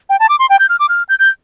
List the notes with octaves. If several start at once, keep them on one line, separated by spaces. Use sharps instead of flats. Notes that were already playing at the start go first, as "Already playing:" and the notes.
G5
A5
D6
C6
G5
G6
F6
D6
F6
G6
G6